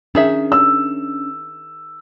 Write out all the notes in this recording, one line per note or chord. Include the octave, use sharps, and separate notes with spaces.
D#3 C#4 D4 G#4 E5
E6